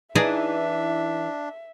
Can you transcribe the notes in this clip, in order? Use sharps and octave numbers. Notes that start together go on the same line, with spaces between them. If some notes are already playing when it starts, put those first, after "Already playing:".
E3 D4 D#4 G#4 D5 E5 A#5